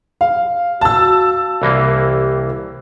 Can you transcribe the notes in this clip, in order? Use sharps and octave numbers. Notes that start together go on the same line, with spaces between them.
F5
F#4 A5 E6
C2 E3 A#3 G4